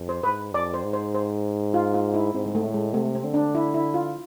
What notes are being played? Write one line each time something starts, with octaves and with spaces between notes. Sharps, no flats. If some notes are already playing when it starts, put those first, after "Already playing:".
Already playing: F2
C5
G#2 B4
F2 D5
C5
G#2
C5
C5
F4
F4
E4
G#2 C4
G#3
A3
A2
G#3
C3 A3
C4
D3
D4
E4
E4
F4